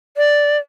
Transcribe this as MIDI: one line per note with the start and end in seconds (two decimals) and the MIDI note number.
0.17 0.57 74